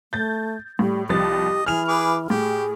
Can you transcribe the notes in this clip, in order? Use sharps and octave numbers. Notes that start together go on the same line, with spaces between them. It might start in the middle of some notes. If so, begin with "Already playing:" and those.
A3 G6 A6
A2 G3
C2 F3 G4 D#5 A6
E3 G#4 F6 F7
G#4 B4 D6
A2 G4 G#4